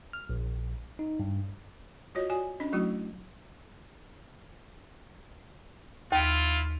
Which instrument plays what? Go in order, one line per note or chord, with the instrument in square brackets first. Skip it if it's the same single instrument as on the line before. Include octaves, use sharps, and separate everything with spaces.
[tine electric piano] F6
A#1
D#4
G2
[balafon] F4 F#4 C#5 D#5
F#4 D5 G#5
C#4 D4 D#5
F#3 A3 E4 F#4
[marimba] D#2 [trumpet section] E4 F4